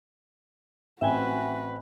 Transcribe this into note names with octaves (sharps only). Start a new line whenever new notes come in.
A1 C4 F#4 B4 E5 G5 G#5